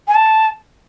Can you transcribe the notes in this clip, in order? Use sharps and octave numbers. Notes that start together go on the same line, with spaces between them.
G#5
A5